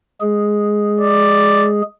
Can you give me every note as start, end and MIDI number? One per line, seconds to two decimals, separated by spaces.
0.21 1.82 56
0.21 1.82 68
1.00 1.68 74